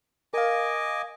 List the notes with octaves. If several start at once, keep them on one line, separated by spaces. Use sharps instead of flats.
A#4 D#5 F5 G#5 D6